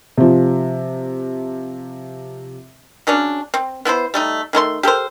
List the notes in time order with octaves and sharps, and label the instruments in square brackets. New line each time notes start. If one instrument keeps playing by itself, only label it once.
[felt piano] C3 F3
[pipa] C#3 F#3 C#4 D4
C4
B3 E4 B4 C5
G3 A3 D#4
D#3 A3 E4 C6
G4 A4 A#4 C5